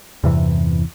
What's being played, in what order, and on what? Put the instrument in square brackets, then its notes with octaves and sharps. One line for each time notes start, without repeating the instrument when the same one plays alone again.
[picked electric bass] E2 G2 C3 E3